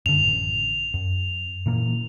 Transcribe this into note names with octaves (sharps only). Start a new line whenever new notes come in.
F#2 D3 F7
A1
F#2
A#2 E3 A#3